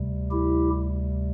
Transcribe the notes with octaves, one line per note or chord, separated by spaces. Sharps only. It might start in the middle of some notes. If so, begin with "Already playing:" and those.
Already playing: D2 C3 G3
E4 G4